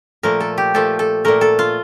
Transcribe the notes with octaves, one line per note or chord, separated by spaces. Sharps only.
A#2 F3 A3 A#4
A4
G4
A#2 F3 A3 A4
A4
A#2 A3 A#4
A4
F4